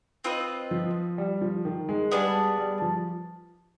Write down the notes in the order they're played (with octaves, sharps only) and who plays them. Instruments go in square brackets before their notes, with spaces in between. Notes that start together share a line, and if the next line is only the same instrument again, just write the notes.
[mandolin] C4 F4 B4 D#5
[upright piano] F3
G3
F3
D#3
G#3
[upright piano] G3 [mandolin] B3 D4 G#4
[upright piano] G3
F3